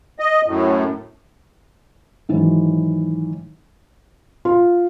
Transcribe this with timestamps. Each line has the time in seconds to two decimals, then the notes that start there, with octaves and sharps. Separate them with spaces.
0.19 D#5
0.46 F#2 A2
2.29 G#2 D#3 E3 F#3
4.45 F4